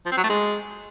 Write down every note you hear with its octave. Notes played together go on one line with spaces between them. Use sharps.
F3
C4
F#3
A3
G#3